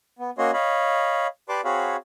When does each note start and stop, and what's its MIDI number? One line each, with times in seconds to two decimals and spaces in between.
0.19 0.30 59
0.38 0.51 58
0.38 0.51 61
0.38 0.51 66
0.38 0.51 73
0.38 0.51 75
0.38 0.51 84
0.53 1.27 73
0.53 1.27 75
0.53 1.27 77
0.53 1.27 83
1.49 1.61 67
1.49 1.61 71
1.49 1.61 74
1.49 1.61 81
1.49 1.61 84
1.49 1.61 86
1.64 1.96 60
1.64 1.96 66
1.64 1.96 68
1.64 1.96 73
1.64 1.96 77
1.64 1.96 83